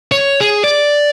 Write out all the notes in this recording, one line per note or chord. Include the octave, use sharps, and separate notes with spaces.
C#5
G#4
D5